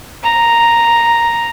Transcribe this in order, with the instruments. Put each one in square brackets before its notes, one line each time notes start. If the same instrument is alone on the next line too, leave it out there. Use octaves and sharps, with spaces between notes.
[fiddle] A#5